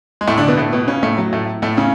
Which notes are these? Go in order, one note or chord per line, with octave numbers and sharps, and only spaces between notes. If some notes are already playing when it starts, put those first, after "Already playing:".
G#3
A2 A3
D3 D4
B2 B3
A2 A3
B2 B3
C#3 C#4
A2 A3
F#3
A2 A3
A2 A3
C#3 C#4